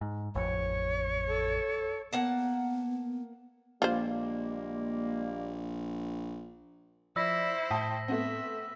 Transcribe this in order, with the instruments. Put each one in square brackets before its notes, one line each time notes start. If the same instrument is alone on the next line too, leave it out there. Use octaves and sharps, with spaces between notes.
[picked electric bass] G#2
[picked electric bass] A1 F2 [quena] C#5
[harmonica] A4
[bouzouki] A#3 F#5 A5 [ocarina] B3
[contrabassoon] A#1 [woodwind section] G3 G#3 A#3 [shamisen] F4 C5
[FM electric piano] F3 D5 B5 [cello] E4 C5 [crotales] E6 A#6 B6
[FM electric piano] A2 [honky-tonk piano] G5 A5 D#6
[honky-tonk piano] A3 B3 C4 [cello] E5